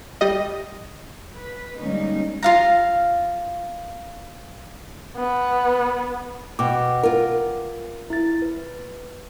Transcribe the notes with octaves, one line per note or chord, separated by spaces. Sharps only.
G3 D#5
B4
D3 G3 G#3 A#3 C#4 D#4
F4 F5 A#5
B3
B2 F#5 G5 D6
F4 A#4
E4 A6
B4